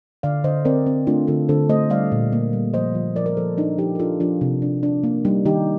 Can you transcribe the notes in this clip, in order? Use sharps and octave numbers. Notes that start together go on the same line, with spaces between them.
D3 D5 F5
D3 C5 D#5
C4 A#4 D5
C4
A3 D4 F4
D3 F4 A4
D3 A4 C5
A3 C5 D#5
G3 D5 F5
A#2
A#3
G3
F3 C5 D#5
F3
F3 A#4 D5
A#4 D5
F3 A4 C5
D4 D#4
F3 D#4 G4
A#4
D4 F4 A4
F3 D4 F4
C3
D4
D4
A#3
G3 D#4
D#3 D#4 G4